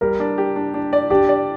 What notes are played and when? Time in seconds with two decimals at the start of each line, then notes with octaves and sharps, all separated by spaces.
0.01 G3 A#4
0.20 D4
0.38 G4
0.56 D4
0.74 D4
0.93 D5
1.10 D4 G4
1.29 D5